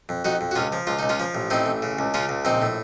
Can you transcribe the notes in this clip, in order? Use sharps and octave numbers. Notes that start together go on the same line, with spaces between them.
F2
F2 D#4 F#4
F2
F#4
C#2 C#4 F4
F3
C#2 F4
C#2 D#4
C#4 F4
F3
A1
A2 C4 D#4
A1
C#3
C#2
C#3 C#4 F4
C#2
A#1 C4 D#4
A2